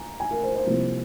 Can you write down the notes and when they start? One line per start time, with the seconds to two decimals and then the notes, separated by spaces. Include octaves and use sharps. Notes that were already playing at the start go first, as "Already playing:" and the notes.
Already playing: G#5 A#5
0.20 G#5
0.31 A#4
0.43 C5
0.55 C5
0.66 C2 C3 F3 A#3